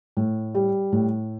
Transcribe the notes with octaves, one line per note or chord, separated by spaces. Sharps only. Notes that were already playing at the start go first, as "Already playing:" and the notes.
A2
G3
A2